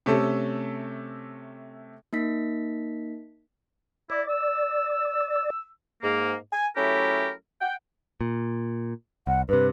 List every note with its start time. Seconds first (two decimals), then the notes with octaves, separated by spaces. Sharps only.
0.06 C3 A3 C#4 A4
2.13 A#3 D#4 B6
4.10 E4 D5
4.29 E6
6.03 G#2 A#3
6.53 G#5
6.76 F#3 A3 C#4 E4 G4 A#4
7.61 F#5 G5
8.21 A#2
9.27 C2 F#5
9.49 G2 C3 B4